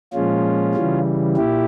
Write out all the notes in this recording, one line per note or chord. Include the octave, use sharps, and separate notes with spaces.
A#2 F3 G#3 C#4 F4
C#3 E3 G3
A#2 E4 G4